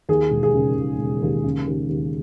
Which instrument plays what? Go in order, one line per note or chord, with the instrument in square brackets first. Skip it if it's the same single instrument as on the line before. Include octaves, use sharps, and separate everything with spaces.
[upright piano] D#2 G#4
E1
G#4
C#3
E1
E1
D#2
C#3
D#2
D#2